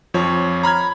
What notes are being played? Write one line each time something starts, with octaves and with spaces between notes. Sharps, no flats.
F2 F3 C#5
A#5 B5 F6 G#6